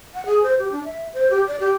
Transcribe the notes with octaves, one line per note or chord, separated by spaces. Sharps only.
F#5
G#4
C5
G4
D4
E5
C5
G4
D5
G4